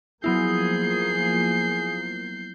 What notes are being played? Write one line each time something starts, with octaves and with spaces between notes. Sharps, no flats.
F3 F#3 A#3 B3 E4 G#4 G6 C7